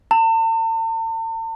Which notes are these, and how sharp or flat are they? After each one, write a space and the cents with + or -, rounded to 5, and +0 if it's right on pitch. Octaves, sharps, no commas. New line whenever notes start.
A5 +45